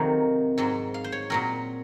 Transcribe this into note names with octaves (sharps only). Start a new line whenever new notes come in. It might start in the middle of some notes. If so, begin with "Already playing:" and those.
Already playing: F2 C3 D#3 F#3 C4 F5
G#2 F#3 C4
F5
C5
C#5
A#2 F#3 C4 A#4